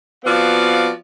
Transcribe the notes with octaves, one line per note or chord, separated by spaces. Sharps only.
F3 B3 C4 F#4 D5 F5